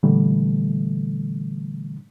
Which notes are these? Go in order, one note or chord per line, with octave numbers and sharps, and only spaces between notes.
A#2 D3 E3 G3 A3